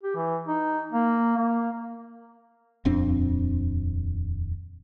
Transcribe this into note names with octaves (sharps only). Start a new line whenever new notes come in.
G4
E3
D#4
A#3
A#3
D#1 F2 C4 D4